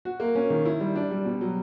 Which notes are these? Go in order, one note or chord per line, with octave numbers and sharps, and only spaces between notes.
F#4
A#3
C#4
D#3
E4
G3
D4
G3
B2
F#3